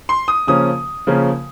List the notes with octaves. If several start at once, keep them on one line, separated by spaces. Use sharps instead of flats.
C6
D#6
C#3 F3 A#3 C#4 D#6
C#3 F3 A#3 C#4